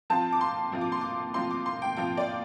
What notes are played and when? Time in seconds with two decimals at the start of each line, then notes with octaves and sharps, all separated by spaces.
0.10 F3 C4 F4 A5
0.33 D6
0.41 C6
0.72 F3 C4 F4
0.81 D6
0.92 C6
1.01 D6
1.34 F3 C4 F4 C6
1.51 D6
1.66 C6
1.82 G5
1.97 F3 C4 F4 G5
2.17 D5